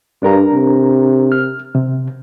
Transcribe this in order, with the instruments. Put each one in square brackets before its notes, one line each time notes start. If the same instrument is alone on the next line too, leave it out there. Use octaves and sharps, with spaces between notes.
[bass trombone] G2 [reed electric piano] D4 A#4 A#5
[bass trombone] C3
[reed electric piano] F6
C3